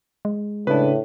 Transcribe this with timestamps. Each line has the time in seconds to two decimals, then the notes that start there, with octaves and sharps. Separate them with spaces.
0.25 G#3
0.67 A2 C#3 D4 B4